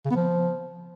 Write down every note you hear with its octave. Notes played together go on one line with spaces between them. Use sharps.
C#3
B3
F3